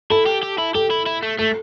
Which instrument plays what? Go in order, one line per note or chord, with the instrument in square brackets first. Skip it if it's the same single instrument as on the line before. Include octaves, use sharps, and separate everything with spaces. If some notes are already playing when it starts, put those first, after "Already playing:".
[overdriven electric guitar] E4 [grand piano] A4
[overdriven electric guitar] G4
G4
E4
[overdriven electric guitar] G4 [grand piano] A4
[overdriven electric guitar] E4
E4
A3
[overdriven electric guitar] A3 [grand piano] A4